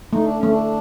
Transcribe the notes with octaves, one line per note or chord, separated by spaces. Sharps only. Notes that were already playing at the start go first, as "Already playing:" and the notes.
A3 D#4
D4
A3 C#4
D4